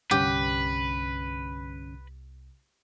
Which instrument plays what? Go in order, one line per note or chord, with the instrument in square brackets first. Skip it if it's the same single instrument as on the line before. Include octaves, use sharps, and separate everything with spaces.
[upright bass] C2 [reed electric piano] G2 D3 C#4 [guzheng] G4 [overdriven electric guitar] B4